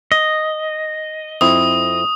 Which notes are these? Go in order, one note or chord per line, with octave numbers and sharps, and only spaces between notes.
D#5
F2 C4 E4 D#6